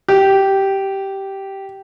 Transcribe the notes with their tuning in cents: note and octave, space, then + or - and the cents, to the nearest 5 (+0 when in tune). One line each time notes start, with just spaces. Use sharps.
G4 -10